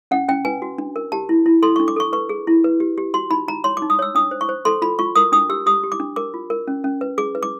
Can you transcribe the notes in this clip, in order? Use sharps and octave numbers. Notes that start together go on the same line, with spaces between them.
C#4 F#5
C#4 G5
B4 G#5
F#4
D4
A#4
G4 A5
E4
E4
A4 C6
D4 C#6
D6
A4 C#6
B4 C#6
G#4
E4
B4
G4
G4
F#4 C6
D#4 B5
D#4 A#5
C#5 C6
D#4 D6
D#6
C#5 E6
D4 D#6
C5
C#6
C5
A4 C6
F4 B5
F4 C#6
A#4 D#6
D4 D#6
G4 E6
G4 D#6
G4
D6
D4
A#4 D6
F4
A#4
C#4
C#4
B4
G#4 D6
B4
D6